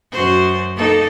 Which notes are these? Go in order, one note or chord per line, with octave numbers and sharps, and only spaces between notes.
F#2 F#4 C5
A#3 D#4 A4